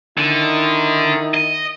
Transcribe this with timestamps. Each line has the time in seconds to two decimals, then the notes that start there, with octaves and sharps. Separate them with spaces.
0.18 D3 D#3 D#4 E4
1.34 D#5